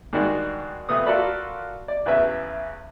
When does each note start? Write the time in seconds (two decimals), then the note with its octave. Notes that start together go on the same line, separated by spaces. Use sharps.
0.13 G#2 D#3 G3 G#3 D4 F#4
0.89 A#1 C3 A3 B3 D#6
1.06 F4 F#4 A4 A#4 D5 B5
1.88 D5
2.06 A1 E2 C#3 B3 B4 E5